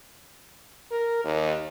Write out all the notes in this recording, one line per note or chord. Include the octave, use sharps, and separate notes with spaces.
A#4
D#2